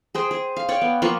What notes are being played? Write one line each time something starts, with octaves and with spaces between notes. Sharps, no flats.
G#4 C5 G5
G#4
F5
C#5 D5 G5
B3
F3 A#3 F4 C#6